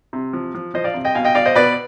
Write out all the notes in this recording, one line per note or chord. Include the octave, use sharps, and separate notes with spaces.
C3
F3
F3
F3 C5 D#5
D5 F5
C3
D#5 G5
B2 F5 G#5
D#5 G5
B2 D5 F5
C5 D#5
B2 B4 D5